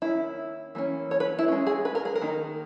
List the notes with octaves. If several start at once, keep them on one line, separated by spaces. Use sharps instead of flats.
D#3 A#3 C#4 E4
E3 A#3 C#4
C#5
B4
E4
G#3 C#4
G#4
B4
A#4
G#4
A#4
D#3 A#3 D#4